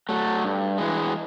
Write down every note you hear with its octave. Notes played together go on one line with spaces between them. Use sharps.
F#3 A3
G2
E3 G#3